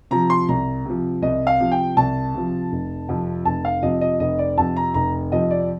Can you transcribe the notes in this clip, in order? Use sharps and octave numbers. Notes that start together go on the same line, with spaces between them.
C3 F3 A#5
C6
C2 A#5
C3 F3
C2 D#5
F5
C3 F3
G5
C2 A5
C3 F3
F1
F2 C3 F3
F1 A5
F5
F2 C3 F3 D#5
D#5
F1 D#5
D5
F2 C3 F3 A5
A#5
F1 A#5
F2 C3 F3 D#5
D5